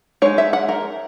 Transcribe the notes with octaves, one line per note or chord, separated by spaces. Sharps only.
G#3 D#4 C#5
E5
F#5
A#4